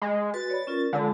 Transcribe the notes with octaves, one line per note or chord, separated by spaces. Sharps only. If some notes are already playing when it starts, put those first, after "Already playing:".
G#3
F#4 B4 A6
C#5 D5 B5
C#4 F4 A#4
D3 G#3 F4 A5